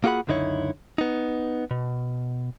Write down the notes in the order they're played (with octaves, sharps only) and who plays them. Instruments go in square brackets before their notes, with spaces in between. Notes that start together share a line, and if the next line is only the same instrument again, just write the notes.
[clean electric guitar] A#3 F4 F#4 G#4 F#5 B5
C#2 F#2 D3 D#4 E4 C#5
B3 D#4
B2